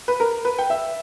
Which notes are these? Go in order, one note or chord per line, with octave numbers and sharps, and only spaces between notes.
B4
A#4
B4
G5
E5